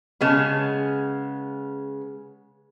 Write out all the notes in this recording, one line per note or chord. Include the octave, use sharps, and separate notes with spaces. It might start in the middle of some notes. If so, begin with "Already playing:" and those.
C#3 G#3 B3